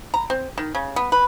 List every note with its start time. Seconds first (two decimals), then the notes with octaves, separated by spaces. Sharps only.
0.14 A#5
0.30 C4
0.58 D#3
0.75 C#3
0.96 B3
1.12 B4